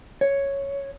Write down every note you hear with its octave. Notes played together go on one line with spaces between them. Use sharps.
C#5